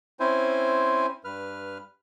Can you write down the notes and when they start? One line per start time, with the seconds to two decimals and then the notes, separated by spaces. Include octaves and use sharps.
0.20 C4 C#4 E4 C5 G#5
1.25 G2 B4 F6